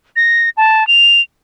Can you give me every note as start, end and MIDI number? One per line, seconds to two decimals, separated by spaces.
0.16 0.49 94
0.57 0.86 81
0.87 1.21 101